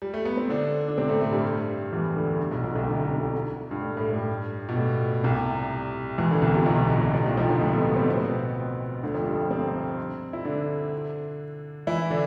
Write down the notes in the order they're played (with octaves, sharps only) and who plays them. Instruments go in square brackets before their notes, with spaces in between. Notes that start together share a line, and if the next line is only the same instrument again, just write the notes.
[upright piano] G3
A3
B3
C4
D3 D4
D4
C3 C4
A2 A3
A2 A3
G2 G3
E2 E3
D2 D3
D2 D3
B1 B2
B1 B2
C2 C3
D2 D3
D3
C2 C3
G2
A2
A2
A2
G2
B2
A2
C2 C3
E2 E3
D2 D3
C2 C3
C2 C3
B1 B2
A2
B2
C2 C3
B1 B2
C2 C3
F2 F3
D2 D3
A2 A3
B2 B3
B3
C3 C4
B3
C4
B2 B3
D2 D3
F2 F3
G2 G3
C3 C4
E4
D3 D4
E3 E4
D3 D4